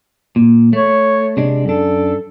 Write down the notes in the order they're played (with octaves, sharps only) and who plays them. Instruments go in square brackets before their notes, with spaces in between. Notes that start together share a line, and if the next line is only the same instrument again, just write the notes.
[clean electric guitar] A#2
[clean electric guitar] A3 [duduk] C#5
[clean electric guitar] C3 G#3 D4
[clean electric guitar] F#2 D4 [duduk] A4